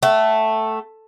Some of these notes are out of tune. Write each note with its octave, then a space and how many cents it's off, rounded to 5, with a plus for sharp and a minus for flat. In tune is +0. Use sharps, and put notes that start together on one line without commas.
A3 +0 F#5 +45